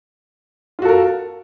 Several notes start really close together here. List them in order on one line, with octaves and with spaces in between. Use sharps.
F4 F#4 A4 A#4